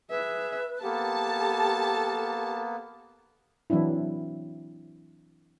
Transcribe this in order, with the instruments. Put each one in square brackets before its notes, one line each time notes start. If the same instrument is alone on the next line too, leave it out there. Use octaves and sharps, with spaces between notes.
[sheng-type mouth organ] G#4 [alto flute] B4 [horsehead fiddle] E5
[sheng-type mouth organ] A#3 B3 [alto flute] G4 [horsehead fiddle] A4 [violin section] A5
[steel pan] E3 F#3 C4 D4 E4